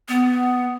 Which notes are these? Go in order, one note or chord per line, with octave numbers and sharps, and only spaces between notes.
B3